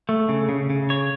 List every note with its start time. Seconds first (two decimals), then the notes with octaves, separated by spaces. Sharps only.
0.09 A3
0.29 C#3
0.49 C#3
0.70 C#3
0.90 C#5